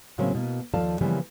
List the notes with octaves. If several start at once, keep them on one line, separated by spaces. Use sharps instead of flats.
A2 C#3 F#3 A#3 C4 C#4
B2 A#3
D#2 F3 A4 D5 F5 A5
C#3 E3 F3 G3 A#3 B3